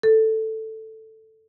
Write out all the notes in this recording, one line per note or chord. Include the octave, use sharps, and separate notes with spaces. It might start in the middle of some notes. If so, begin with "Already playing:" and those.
A4